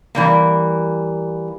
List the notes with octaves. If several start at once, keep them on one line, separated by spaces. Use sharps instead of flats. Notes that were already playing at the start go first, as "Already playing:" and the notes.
E3 G3 A#3